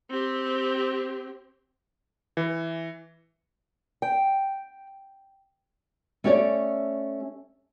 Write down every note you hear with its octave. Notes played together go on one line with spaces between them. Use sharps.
C4 G4
E3
G5
A3 C#4 G4 C#5 D5